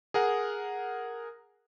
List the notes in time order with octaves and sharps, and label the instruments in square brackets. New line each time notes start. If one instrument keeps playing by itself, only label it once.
[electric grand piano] G#4 A#4 F#5